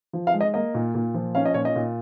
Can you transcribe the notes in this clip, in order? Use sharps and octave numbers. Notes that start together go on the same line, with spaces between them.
F3
F5
G#3
D#5
A#3 D#5
A#2
A#2
F3
C#4 F5
D#5
A#2 C#5
D#5
A#2